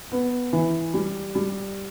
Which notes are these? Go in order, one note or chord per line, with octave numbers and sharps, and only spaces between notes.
B3
E3
G3
G3